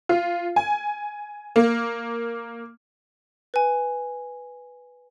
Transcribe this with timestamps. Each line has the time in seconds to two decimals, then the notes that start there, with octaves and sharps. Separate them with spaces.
0.09 F4
0.56 G#5
1.56 A#3
3.54 B4 G#5